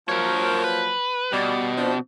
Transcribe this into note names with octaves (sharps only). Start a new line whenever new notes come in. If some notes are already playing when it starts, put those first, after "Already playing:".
F3 F#3 A#3 A#4 C#5
B4
B2 G3 D5
F3 C4 D4